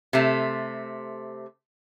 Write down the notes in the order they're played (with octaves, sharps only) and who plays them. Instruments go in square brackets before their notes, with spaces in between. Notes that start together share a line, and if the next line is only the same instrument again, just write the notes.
[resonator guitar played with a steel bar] C3 A3